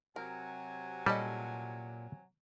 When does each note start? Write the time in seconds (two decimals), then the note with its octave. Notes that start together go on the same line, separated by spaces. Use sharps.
0.16 C3 F#3 A#4 G#5
1.06 A#2 G3 C#4 A4 D#5